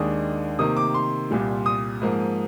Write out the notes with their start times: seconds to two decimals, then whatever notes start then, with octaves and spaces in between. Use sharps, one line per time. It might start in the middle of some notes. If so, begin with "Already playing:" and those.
Already playing: D#2 D#3 G#3 D4 D#6
0.59 C3 D#3 A#3 D#6
0.77 D6
0.94 C6
1.31 C2 A#2 G3
1.66 D#6
2.01 G#2 F3 A#3